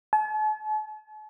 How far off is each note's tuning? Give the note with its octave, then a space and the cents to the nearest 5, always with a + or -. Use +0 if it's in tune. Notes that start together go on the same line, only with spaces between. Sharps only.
A5 -45